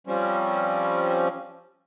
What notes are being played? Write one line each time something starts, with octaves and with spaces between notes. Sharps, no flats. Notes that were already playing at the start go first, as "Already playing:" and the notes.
F3 G3 C4 C#4